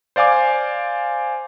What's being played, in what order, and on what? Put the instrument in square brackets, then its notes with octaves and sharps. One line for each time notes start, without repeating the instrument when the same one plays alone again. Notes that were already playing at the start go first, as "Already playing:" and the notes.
[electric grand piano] C5 D5 F5 G#5 D6